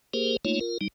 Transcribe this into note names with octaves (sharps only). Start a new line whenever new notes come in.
A#3 G4 G#4 A#4 C5
A3 A#3 D#4 F4 C#5
F4 A#4
G3 D#4